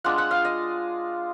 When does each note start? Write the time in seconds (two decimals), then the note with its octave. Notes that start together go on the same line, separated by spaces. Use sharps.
0.04 G#3 D4 F4 F#5
0.18 F#5
0.31 F5
0.45 D#5